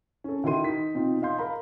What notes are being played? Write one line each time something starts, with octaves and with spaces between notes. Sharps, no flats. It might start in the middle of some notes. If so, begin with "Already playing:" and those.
C#4 A4
D#3 E4 F#4 A#4 C6 D#7
D#4 B6
B2 C4 D#4 F4
D#5 F5 C6 G6
A#4 F5 A#5 B5